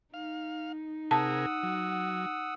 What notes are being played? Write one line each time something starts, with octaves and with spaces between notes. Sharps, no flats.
D#4 F5
C3 G#4 A#4 F#5 A5 D#6 E6
F#3